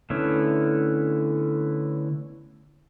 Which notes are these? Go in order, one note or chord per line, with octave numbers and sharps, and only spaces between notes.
D3 A3 B3 C#4 E4